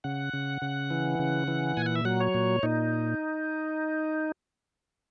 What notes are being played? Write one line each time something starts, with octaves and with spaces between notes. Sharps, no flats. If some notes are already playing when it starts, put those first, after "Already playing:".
C#3 F#5
C#3
C#3
E3
C#3
E3
A#2 G#5
F#5
E5
F#3 F#5
C#5
A#2
A#2 D#4